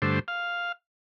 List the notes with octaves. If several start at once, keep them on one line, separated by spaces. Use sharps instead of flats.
G2 D3 A3 C5
F5